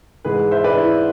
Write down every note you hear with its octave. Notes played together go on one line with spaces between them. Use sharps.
G#2 E3 G#3 G#4 B4
C5 E5
B4 D5
E4